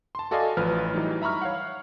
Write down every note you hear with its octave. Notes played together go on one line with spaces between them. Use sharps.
A5 C6
F#4 A4 D5 D#5 F5 G#5
A1 F3 B4 F6
E3 F#3 G3 D#4
E5 A#5 B5 C#6 F6
C#5 F5 F#5